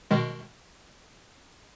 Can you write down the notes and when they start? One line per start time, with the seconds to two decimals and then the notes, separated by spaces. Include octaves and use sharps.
0.11 B2 D#3 G#3